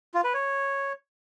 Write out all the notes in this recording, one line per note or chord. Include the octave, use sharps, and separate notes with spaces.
F4
B4
C#5